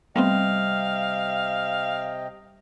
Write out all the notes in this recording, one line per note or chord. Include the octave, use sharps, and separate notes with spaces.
C3 G3 A3 B3 C4 D#5 F5 G5